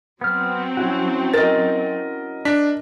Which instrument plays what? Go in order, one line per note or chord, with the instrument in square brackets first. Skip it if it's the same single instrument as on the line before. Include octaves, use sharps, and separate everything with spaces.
[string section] F#3 C4 [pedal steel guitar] B3 F6
[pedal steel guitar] C#4 E4 F#4
[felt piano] A#4 D#5 [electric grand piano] A6
[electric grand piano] D4 B6